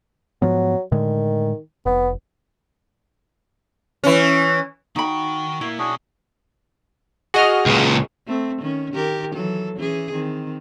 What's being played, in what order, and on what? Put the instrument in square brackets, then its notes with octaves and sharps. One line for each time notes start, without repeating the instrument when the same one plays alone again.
[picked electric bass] G#2 F3 B3 [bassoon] F#3
[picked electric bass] A2 D3 G#3 [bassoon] D#3
[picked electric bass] F1 [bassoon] B3
[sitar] E3 C#4
[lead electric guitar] D#3 G5 [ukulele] D#4 B5 [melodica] F#4
[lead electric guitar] A#2 A#3 [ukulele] E4
[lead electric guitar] B2 C#5 [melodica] D4 F#4 G#4
[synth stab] F#4 D#5 F6 [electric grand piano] G#4 C#6
[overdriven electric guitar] C#2 A#2
[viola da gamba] A3 C4
D#3 C#4
D#3 G4 A#4
E3 F#3 A4
E3 C#4 G#4
D#3 C4